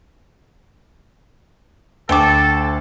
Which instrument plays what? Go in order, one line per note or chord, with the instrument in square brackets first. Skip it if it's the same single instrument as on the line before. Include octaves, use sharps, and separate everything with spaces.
[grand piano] D2 [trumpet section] A4 [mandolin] G5 D6